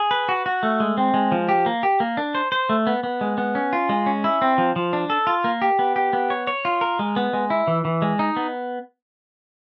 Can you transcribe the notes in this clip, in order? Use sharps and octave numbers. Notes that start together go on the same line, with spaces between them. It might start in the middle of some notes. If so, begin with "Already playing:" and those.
Already playing: G#4
B4
F#4
F#4
A3
G#3
C4
G#3
F3
G4
A#3
G4
A#3
D4
C5
C5
A3
B3
B3
G#3
B3
C#4
F4
G#3
C#4
E4
C4
F3
F3
D4
A4
F4
A#3
G4
B3
G4
B3
C#5
C#5
F4
A#4
G#3
B3
G#3
E4
E3
E3
G#3
D#4
B3